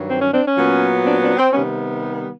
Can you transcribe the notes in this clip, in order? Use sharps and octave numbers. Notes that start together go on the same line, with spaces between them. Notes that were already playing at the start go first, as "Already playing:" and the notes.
Already playing: G2 D#3 F#3
C4
C#4
C4 D4
C#4
A#2 F#3 B3
C4 D4
C4 D4
C4
C3 D#3 G3 B3 C#4